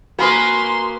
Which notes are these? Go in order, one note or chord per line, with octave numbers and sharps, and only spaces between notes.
A#3 F#4 A#4 B4 G#5 C6 D#6